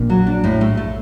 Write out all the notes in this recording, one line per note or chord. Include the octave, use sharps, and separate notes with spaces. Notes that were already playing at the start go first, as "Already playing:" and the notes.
Already playing: A#1 A#2
F#3
D4
A2
A3
A3